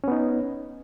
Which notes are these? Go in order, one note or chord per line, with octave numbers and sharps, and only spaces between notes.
B3 C#4 D#4